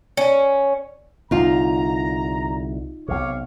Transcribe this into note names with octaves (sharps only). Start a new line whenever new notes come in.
C#4
C2 D3 D#4 F4 A#5
B1 C3 C#5 F5 D6